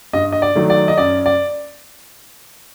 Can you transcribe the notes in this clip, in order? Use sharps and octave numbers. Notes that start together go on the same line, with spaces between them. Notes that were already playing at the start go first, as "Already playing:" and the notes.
G2 D#5
D#5
D5
D#3 F#3 A3
D5
D#5
F#2 D5
D5